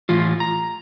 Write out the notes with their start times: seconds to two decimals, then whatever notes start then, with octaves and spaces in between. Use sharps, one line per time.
0.09 A2 E3 F4
0.40 A#5